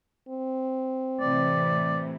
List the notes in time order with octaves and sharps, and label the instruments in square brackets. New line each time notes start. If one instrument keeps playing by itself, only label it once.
[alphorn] C4
[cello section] A2 C3 E3 [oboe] D5